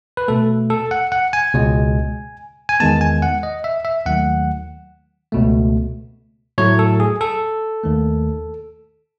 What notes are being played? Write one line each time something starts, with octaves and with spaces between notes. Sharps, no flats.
B4
B2 A3 A4
A4
F#5
F#5
G#5
C#2 B2 G#3
G#5
E2 D#3 G#3 B3 A5
G#5
F#5
D#5
E5
E5
D#2 D#3 F#3 A3 F#5
C#2 B2 A3
A2 F#3 A3 C#5
A4
G#4
A4
D#2 D#3 A3